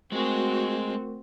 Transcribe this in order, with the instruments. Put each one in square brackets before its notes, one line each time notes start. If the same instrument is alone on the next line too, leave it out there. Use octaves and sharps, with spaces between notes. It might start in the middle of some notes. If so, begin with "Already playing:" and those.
[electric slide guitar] G#3 G#4 [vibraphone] A3 A#4 [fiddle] C4 [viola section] F#4